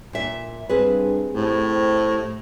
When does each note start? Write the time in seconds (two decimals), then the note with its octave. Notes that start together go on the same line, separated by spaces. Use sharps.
0.13 A#2 E5
0.69 G2 C4 G#4 B4
1.35 A2 G4 C5